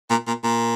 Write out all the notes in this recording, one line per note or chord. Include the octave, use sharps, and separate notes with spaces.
A#2
A#2
A#2